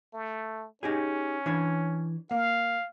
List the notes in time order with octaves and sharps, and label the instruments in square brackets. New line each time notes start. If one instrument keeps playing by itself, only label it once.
[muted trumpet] A3
[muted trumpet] C#4 [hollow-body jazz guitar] D#4 G4 G#4
[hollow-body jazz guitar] E3 D4 C#5
[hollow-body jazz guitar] A#3 [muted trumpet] F5